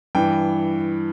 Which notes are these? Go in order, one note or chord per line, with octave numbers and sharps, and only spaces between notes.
G2 E3 G5